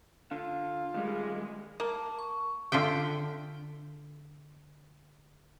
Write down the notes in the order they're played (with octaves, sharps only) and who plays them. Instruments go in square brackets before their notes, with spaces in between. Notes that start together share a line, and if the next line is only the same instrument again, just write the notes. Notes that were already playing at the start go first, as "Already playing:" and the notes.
[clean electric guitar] D3 [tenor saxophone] F4
[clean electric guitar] D#2 G3 [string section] G#3
[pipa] A#3 [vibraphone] A5
[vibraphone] C#6
[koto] D3 F4 E5 G5